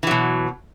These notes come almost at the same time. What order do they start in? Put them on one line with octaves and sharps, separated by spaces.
E3 F#3 B2